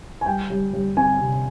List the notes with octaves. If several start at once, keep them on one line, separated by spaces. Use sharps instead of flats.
G#5
G3 G5
G3
G3
C4 G#5
C3